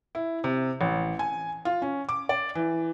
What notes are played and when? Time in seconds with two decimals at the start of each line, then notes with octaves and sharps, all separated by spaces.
0.15 E4
0.44 C3
0.81 A1
1.19 G#5
1.65 F4
1.82 C#4
2.09 D6
2.29 D5
2.55 E3